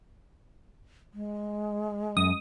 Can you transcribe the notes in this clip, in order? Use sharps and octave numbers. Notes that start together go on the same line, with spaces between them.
G#3
F#2 D#6